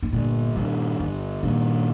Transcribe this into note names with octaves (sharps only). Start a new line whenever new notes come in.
G#2
G1 A#2
G2 A#2 D#3
G1 G2
G2 A#2 D#3